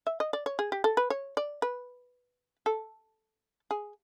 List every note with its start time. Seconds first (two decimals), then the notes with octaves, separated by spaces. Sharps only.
0.07 E5
0.20 D#5
0.33 D5
0.46 C#5
0.59 G#4
0.72 G4
0.84 A4
0.97 B4
1.10 C#5
1.37 D5
1.62 B4
2.66 A4
3.71 G#4